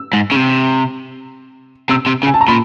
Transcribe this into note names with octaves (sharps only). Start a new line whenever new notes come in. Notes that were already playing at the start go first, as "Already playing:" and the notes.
Already playing: E6
G#2
C#3
C3
C3 E6
C3
C#3
G#5
A5
A#5
A#2 B5